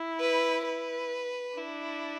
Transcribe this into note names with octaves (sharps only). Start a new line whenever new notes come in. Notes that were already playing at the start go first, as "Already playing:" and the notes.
Already playing: E4
B4
B4
D4 E4